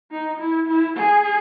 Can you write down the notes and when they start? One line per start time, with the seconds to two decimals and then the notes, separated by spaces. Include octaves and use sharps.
0.11 D#4
0.39 E4
0.68 E4
0.96 G#4